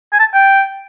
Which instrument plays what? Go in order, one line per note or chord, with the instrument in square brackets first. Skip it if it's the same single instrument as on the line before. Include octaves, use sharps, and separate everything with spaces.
[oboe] G#5
A5
G5